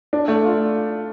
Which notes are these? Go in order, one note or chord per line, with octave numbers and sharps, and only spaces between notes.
D4
A3
F4